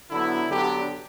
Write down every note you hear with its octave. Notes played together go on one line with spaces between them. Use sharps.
D3 F#3 B3 E4
D3 F#3 B3 D4 G4